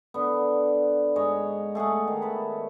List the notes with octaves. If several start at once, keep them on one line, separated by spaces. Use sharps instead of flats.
D3 B3
G#2 C#5 D#5
A3 G#4 A4 F#5
D#3
B4 A5